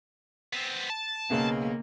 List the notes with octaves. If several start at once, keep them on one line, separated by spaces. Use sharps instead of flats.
B3 C4
A5
B1 C#3 A#3 B3